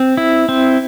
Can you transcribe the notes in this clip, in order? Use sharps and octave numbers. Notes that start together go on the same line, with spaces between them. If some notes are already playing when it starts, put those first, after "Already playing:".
Already playing: C4
E4
C4